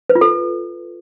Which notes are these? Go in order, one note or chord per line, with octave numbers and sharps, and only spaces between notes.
B4
F4
A4